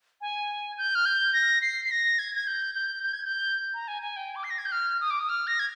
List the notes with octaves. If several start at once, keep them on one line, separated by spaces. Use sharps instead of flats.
G#5
G6
F6
G6
A#6
C7
C7
A#6
G#6
G#6
G6
G6
G6
G#6
G6
A#5
G#5
G#5
G5
D6
C7
A#6
G#6
G6
F6
D#6
D6
D#6
F6
A#6
G#6